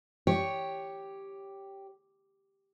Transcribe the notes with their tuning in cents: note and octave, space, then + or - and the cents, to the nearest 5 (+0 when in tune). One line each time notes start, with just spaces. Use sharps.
G4 +0 C#5 +0